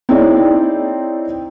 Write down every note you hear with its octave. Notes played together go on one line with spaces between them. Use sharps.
C4 D#4 E4 G#4 C#5 D5